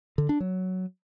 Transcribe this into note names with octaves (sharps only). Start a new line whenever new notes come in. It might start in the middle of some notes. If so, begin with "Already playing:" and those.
D3
D4
F#3